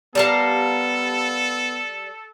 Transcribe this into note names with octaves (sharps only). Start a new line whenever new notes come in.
G3 B3 A4 A#4 F5 A5 D6